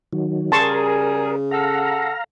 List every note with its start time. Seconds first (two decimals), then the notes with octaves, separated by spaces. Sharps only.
0.13 D#3 F#3
0.52 C#3 G3 G#4 A#4 A5 C6 C#6
1.51 A4 F5 F#5 A#5